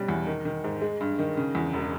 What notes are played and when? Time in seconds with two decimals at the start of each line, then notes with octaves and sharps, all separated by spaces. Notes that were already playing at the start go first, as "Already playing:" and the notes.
Already playing: B2 G3 C#4
0.08 E2
0.27 D#3
0.45 D#3
0.64 G#2
0.81 G#3
1.00 G2
1.19 D#3
1.37 C#3
1.55 E2
1.73 E1